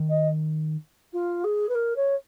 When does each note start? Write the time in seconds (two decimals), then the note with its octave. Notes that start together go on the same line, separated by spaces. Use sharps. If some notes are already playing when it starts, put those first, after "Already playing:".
Already playing: D#3
0.09 D#5
1.12 F4
1.44 G#4
1.69 B4
1.75 A#4
1.96 C#5